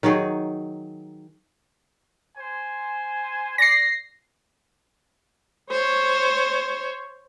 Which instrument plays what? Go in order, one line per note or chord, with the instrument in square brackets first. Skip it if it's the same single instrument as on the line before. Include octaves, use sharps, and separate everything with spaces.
[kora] D#3 F#3 D#4 G#4
[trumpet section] C5 G#5
[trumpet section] D5 [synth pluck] A#6 C7
[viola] C5 C#5